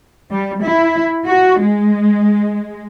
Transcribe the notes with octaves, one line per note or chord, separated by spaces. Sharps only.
G3
E4
F#4
G#3